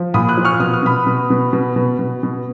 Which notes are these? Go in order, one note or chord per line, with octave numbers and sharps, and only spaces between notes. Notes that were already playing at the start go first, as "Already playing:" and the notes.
Already playing: F3
A#2 B5 D#6
D#6 F#6
F3
C#6 F6
B2 D#6
F6
B2 B5 D#6
B2
B2
B2
B2
B2
B2